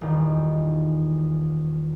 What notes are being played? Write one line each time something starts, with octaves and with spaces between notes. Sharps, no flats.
D#1 E2 D#3